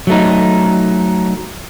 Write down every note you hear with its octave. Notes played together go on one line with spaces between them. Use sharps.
F#3 A3 D#4